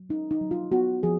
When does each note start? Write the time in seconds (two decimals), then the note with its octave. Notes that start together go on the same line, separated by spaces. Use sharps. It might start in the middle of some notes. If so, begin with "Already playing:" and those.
Already playing: F#3
0.09 C#4 D#4
0.31 D#4
0.41 F#3
0.51 F4
0.72 B3 F#4
1.03 F3 G#4